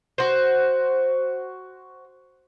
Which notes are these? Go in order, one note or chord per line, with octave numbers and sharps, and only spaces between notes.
F#4 C5